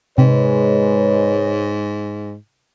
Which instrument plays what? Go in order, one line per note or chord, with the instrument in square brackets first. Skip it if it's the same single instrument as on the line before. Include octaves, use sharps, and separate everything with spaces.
[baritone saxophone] G#2 [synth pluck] C3 [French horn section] G#3 B4 C#5